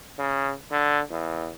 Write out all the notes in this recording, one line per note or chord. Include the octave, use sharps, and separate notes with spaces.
C#3
D3
E2